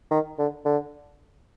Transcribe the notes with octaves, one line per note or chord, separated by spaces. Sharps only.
D#3
D3
D3